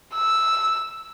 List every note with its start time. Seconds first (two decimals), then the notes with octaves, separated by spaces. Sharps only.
0.15 E6